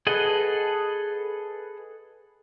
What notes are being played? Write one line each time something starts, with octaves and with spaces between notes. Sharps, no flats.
G#4 A4 B4 D#5 F#5